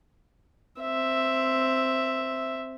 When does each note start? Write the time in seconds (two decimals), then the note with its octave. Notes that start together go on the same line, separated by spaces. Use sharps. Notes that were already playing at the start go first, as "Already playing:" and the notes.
0.81 C4 E5